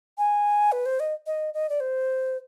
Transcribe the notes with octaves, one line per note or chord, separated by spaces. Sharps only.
G#5
B4
C5
D#5
D#5
D#5
D5
C5